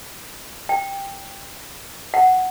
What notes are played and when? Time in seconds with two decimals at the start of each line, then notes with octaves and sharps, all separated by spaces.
0.69 G5
2.14 F#5